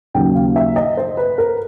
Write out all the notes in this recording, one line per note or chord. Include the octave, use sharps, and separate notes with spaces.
D#2 C#3 F#3 A#3 G5
F5
E5
D#5
C5
B4
A#4